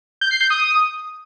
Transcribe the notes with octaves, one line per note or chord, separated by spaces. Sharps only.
G6
C7
G6
D#6